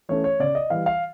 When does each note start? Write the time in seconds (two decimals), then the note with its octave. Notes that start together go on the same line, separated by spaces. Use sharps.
0.09 E3 A3 C#4 C#5
0.24 C#5
0.39 C#3 D5
0.55 D#5
0.70 E3 G3 F5
0.86 F5